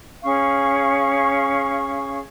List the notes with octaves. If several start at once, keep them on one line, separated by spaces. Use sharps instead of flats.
C#4 G#4 F5 C#6